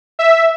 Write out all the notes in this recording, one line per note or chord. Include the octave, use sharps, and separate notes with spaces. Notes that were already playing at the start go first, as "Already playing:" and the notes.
E5